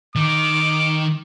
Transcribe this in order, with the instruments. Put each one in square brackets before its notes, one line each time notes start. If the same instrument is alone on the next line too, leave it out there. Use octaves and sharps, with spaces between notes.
[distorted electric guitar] D#3 [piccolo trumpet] D6